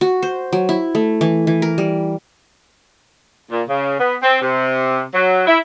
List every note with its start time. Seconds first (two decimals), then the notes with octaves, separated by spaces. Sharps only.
0.01 F#4
0.23 C5
0.53 F#3
0.69 E4
0.95 A3
1.21 E3
1.47 E3
1.62 A#4
1.78 G3
3.51 A#2
3.68 C#3
3.99 B3
4.22 C4
4.41 C3
5.14 F#3
5.47 E4